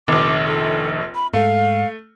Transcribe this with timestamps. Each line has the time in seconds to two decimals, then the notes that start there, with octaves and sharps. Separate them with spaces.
0.08 F1 A#1 D#3 D6
0.47 A4
1.15 B5
1.33 G#2 A3 F5